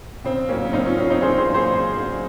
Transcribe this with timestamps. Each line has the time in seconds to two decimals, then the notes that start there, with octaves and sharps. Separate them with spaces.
0.24 C#3 C4
0.49 F#3 A#3 C#4
0.65 C#4
0.73 C#3 C4 D#4
0.86 C#4 F4
0.98 F#3 A#3 C#4 F4
1.10 C4 D#4
1.22 C#3 G#4 C5
1.38 G#4 C5
1.46 F#3 A#3
1.54 G#4 C5
1.70 C#3
1.95 F#3 A#3